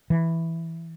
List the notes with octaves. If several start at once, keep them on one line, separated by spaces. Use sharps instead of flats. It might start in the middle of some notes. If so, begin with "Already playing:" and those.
E3